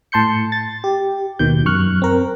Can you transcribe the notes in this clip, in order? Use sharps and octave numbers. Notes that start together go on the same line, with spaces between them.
A2 A5 C6 G6 C#7
A6
G4
D#2 B2 D#3 G6
F#2 C#6 F6 F#6
C4 A#4